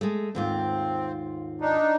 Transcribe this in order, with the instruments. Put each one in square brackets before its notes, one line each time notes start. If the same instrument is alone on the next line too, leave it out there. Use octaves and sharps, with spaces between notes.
[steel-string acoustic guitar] G#3 A3
[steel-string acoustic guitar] D#2 G#2 F4 [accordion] C4
[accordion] D4 D#4